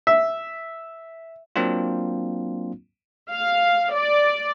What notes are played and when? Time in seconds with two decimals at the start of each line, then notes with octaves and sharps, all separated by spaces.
0.07 E5
1.56 F#3 A#3 C4 D4 F4
3.31 F5
3.93 D5